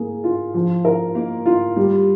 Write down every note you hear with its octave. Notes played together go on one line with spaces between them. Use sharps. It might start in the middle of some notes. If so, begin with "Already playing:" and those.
Already playing: A#3 G#4
F4
F3
A#4
A#3
F4
G3